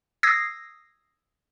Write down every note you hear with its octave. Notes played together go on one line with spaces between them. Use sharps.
D#6 E6 G#6 A#6 C7